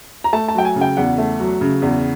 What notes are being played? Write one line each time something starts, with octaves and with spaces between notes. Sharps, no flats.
A#5
A3 A5
A5
F#3 G5
G#5
C#3
G5
E2 F#5
A3
F#3
C#3
E2